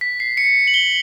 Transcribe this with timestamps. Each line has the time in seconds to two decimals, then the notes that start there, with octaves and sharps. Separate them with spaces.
0.01 B6
0.20 C7
0.37 C#7
0.68 F#7
0.74 G7